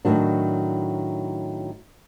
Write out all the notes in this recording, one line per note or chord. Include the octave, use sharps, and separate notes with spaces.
A2 D#3 F#3 D4